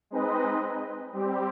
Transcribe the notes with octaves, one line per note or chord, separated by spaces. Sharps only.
G#3 C4 D#4 B4 D#5
G3 C4 G4